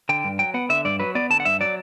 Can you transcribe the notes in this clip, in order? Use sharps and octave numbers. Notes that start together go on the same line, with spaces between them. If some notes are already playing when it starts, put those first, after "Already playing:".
D3 G5
G2
F#3 G5
B3 F#5
D3 E5
G2 D5
F#3 B4
B3 D5
D3 A5
F#5
G2 E5
F#3 D5